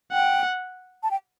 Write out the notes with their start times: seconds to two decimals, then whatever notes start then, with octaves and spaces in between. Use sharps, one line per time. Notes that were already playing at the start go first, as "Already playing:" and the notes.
0.12 F#5 G5
1.03 A5
1.11 G5